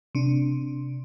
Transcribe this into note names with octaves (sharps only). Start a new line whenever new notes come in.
C3 D4